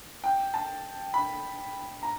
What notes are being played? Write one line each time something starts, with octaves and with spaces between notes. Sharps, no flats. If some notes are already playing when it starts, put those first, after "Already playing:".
G5
A5
B5
A#5